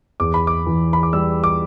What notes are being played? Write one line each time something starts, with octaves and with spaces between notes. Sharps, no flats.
E2 D6
B5
D6
E3
B5
D6
G3 E6
D6